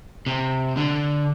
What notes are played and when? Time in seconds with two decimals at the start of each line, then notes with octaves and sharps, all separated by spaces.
0.26 C3
0.77 D3